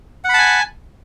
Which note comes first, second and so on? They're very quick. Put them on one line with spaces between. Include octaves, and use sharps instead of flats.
F#5 B5 A5 G#5